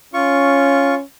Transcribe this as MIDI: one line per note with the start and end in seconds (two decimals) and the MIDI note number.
0.14 1.03 61
0.14 0.95 65
0.14 0.95 85